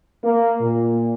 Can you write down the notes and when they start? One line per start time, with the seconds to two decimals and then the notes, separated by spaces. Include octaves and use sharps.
0.24 A#3
0.61 A#2